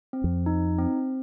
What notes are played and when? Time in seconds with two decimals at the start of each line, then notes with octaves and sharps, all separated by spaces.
0.13 C4
0.24 F2
0.46 D#4
0.78 C4